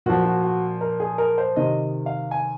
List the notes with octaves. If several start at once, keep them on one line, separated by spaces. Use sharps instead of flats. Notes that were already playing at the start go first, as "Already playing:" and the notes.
A#2 F3 F#4
F#4
F#4
A#4
G#4
A#4
C5
C3 D#3 D#5
F5
G#5